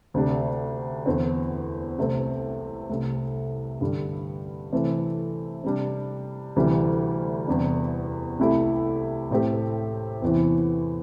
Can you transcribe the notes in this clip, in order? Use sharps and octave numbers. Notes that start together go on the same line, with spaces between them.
D2 C3 A3 D4 G4
E2 D3 C4
C2 C3 A3 C4
C2 C3 A3
G2 D3 G3
C3 E3 A3 C4
C3 G3 D4
D2 C3 E3 G3
E2 C3 G3 D4
C2 C3 A3 E4 G4
A2 A3 C4 G4
E2 C3 E3 C4 E4